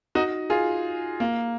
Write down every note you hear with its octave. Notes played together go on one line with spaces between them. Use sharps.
D#4 F#4
F4 G#4
A#3